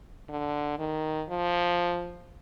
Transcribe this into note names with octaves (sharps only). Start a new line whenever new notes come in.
D3
D#3
F3